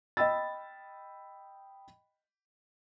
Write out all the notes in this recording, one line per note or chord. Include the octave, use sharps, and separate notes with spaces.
D#5 G5 B5 E6 A6